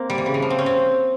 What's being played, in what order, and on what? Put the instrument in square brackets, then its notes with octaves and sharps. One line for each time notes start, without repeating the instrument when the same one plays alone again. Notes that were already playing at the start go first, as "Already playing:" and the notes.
Already playing: [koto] A#3 C4
G3
E3
C#3
E3
F3
C4
C#4
C4